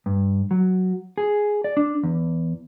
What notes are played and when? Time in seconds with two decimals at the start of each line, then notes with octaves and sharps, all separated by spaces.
0.06 G2
0.51 F#3
1.18 G#4
1.64 D5
1.77 D4
2.03 E2